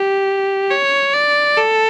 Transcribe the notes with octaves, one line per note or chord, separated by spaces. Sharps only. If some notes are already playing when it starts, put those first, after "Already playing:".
Already playing: G4
C#5
D5
A4